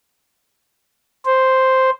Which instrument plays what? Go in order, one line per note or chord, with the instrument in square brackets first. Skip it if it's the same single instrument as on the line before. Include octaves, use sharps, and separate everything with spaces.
[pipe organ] C5